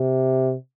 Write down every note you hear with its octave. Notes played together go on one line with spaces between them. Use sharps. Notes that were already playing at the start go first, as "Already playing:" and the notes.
Already playing: C3